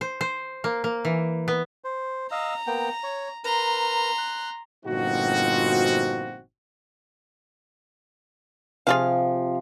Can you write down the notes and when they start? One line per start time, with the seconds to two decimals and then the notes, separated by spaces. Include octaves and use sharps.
0.01 C5
0.21 C5
0.64 A#3
0.84 A#3
1.05 E3
1.48 B3
1.84 C5
2.31 D#5 F5 A#5 E6
2.67 A#3 B3 G5
3.04 C#5
3.44 A#4 B4 A#5 C6
4.18 F#6
4.85 G1 A#2 F3 C4 D#4 F#4
8.87 C3 F3 F4 G#4 F5